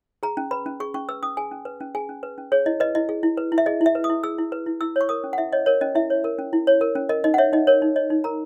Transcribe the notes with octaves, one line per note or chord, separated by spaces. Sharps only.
G#4 A#5
C#4
B4 B5
C#4
G#4 C#6
C#4 C#6
B4 E6
C#4 D#6
G#4 G#5
C#4
B4
C#4
G#4 G#5
C#4
B4
C#4
G#4 C#5
E4 D#5
B4 D#5
E4 D#5
G#4
E4
B4
E4
E5
G#4 D#5
E4
E5
B4
D#6
E4
G#4 E6
E4
B4
E4
E4 E6
C#5 C#6
A#4 D#6
C#4
F#5
E4 E5
C#5 D#5
A#4 C#5
C#4 D#5
E4 E5
C#5
A#4
C#4
E4
C#5
A#4
C#4
A#4 D#5
D#4 D#5
F#5
C#5 E5
D#4 D#5
A#4 C#5
D#4
C#5 D#5
D#4
A#4 A#5